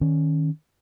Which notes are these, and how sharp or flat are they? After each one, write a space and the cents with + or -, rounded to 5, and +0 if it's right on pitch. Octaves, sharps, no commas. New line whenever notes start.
D#3 +0 C#4 +0